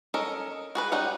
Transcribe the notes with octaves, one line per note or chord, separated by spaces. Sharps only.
C#4 A4 A#4 D#5
F#4 G#4 B4
G3 C#4 D#4 D#5 F#5